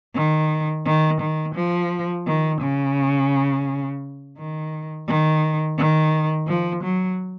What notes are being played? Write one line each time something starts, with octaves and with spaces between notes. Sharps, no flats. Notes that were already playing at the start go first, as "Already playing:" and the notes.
D#3
D#3
D#3
F3
D#3
C#3
D#3
D#3
D#3
F3
F#3